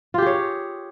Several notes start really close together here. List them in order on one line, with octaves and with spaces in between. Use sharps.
F4 G4 G#4 C#5